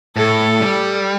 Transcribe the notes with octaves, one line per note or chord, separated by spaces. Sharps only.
A2 A4
G3